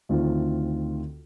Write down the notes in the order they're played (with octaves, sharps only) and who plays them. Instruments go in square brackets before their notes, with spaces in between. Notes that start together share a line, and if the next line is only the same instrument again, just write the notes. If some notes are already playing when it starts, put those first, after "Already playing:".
[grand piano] D2 D#3 C4 F4